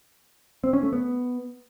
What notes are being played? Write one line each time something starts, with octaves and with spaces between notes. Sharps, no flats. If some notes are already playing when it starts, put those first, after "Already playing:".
C4
C#4
A3
B3